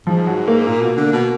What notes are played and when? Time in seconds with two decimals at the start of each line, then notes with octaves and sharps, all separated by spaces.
0.07 G#2 F3
0.27 F#3
0.47 A#3
0.67 A#2
0.82 B2
0.97 D3
1.12 B2